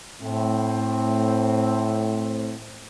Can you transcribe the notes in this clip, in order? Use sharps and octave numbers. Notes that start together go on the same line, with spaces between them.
A2 C4